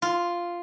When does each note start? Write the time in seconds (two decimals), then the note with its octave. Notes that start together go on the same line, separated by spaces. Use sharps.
0.02 F4